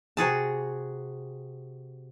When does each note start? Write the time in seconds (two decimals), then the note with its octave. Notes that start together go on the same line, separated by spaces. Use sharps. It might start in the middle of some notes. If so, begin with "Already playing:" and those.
0.17 C3 F#4 G#4 A5